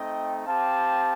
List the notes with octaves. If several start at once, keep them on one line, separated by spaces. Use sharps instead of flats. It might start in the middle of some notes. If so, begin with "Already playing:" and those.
Already playing: A3 C4 D#4 D#5 G5
C4 G4 F5 A5